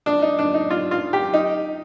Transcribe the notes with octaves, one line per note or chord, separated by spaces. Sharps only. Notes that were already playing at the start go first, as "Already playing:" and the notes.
D4
D#4
D4
D#4
F4
F4
G4
D#4